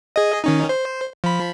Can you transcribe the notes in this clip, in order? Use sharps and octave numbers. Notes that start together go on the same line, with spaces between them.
G#4 D#5
D#3 C#4 D#4
C5
F3 B5